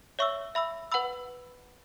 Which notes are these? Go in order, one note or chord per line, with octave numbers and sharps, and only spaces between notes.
C#5 E5 C#6 E6
E5 B5 E6
B4 F#5 B5 E6